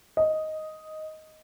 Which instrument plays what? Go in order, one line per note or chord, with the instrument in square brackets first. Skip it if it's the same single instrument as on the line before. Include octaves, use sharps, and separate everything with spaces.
[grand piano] D#5